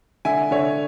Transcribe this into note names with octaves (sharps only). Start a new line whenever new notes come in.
D3 E5 G#5
D3 C#5 E5